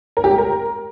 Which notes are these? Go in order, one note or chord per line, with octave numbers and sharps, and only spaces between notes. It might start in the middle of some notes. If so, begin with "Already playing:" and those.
A#4
G4
G5
A#4